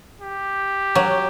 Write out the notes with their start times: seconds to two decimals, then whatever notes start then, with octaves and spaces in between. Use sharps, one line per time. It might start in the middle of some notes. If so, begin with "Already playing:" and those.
0.20 G4
0.95 F#3